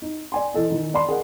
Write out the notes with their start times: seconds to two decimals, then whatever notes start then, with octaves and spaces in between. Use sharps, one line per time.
0.02 D#4
0.32 D5 G#5 C6
0.54 E3 A4 D#5
0.70 D#3 D#4
0.94 D5 A5 B5 C6
1.08 G#4 A#4 D#5 F#5